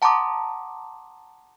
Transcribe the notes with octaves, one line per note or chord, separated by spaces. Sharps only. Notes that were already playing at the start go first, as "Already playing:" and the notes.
F#5 A5 A#5 C6 D6 D#6